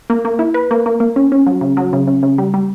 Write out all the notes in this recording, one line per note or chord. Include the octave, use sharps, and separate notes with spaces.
A#3
A#3
E4
B4
A#3
A#3
A#3
C#4
C#4
F#3
C#3
F#3
C#3
C#3
C#3
G3
G3